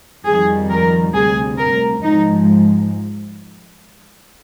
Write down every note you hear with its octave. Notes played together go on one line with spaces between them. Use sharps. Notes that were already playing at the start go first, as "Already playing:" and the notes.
F2 D#3 G3 G#4
A#4
D2 C3 G3 G#4
A#4
G#2 F3 G#3 D#4